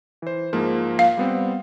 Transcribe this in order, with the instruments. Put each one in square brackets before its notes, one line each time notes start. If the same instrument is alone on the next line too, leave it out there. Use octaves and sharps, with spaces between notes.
[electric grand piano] E3 C5
G#2 F3 A#3
[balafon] F5
[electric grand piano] G3 B3 C4